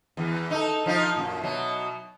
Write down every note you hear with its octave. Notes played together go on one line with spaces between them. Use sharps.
E2 E3
D#4 A4
F3 D#4 F4
F#2 A#2
B2 F#3